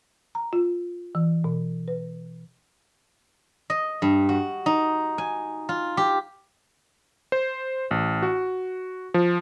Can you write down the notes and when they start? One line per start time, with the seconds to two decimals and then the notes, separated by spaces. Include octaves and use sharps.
0.35 A#5
0.53 F4
1.15 E3
1.44 B2
1.88 B4
3.70 D#5
4.02 G2
4.29 F#4
4.66 D#4
5.18 G#5
5.69 F4
5.97 G4
7.32 C5
7.91 A1
8.22 F#4
9.14 F3